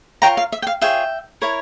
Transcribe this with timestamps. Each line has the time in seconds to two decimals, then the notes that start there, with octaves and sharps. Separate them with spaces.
0.22 F4 A#4 C#5 G5 A#5
0.37 F5
0.52 E5
0.62 G5
0.67 F5
0.82 F4 G#4 C#5 E5 G5
1.42 E4 A#4 C#5